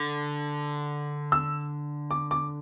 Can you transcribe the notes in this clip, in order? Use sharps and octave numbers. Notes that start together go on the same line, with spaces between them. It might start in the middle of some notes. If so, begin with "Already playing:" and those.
Already playing: D3
E6
D6
D6